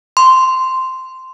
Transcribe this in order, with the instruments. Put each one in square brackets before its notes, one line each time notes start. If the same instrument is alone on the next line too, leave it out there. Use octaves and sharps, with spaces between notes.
[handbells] C6